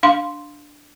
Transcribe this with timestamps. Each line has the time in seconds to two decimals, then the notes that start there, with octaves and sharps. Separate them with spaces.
0.03 D4 F5 C6